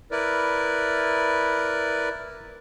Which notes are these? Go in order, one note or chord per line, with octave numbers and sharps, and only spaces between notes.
E4 A#4 B4 D5